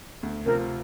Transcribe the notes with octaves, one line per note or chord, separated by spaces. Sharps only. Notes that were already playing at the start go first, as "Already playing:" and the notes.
D2
C3 F3 C4 F4 A#4